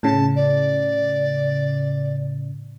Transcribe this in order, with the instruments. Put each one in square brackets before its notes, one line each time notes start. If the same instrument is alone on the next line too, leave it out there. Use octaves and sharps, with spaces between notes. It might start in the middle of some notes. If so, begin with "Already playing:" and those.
[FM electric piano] A2 C#3 [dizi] A5
[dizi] D5